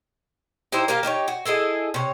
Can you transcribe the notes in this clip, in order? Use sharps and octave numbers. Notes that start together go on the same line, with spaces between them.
D#4 E4 G4 C5
A#3 G4 A#4 F5
D4 D#4 G4 C#5
F#4
E4 G#4 A4 D#5
C3 C#5